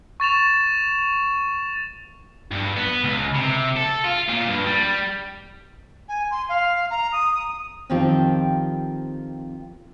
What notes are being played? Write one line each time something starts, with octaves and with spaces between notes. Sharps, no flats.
C#6 A6 E7 F7
G2
B3
C#2
C3
A4
F4
A#2
G2
G3
G#5
C6
F5
A#5
D#6
F2 D#3 F3 C4 F4 G4